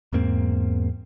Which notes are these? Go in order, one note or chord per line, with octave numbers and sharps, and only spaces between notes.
E2 G#2 A#3 C4